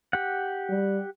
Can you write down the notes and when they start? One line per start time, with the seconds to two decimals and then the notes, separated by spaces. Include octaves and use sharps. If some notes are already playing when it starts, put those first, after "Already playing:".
0.13 G4 F#5
0.69 G3